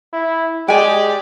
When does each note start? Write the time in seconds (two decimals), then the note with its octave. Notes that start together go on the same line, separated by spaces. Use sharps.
0.13 E4
0.68 G#3 G4 G#4 D5 G5 G#5